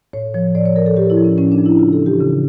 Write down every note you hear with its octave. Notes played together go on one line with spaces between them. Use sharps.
A2 C#5
F3 C#5
A2 D5
C#5
F3 A#4
A4
A2 G4
E4
F3
C#4
A2 C#4
D4
F3
E4
C#3 F4
A4
E3
G4
C#3